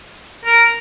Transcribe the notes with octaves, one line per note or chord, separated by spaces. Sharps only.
A#4